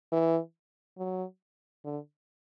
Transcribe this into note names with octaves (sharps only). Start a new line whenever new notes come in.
E3
F#3
D3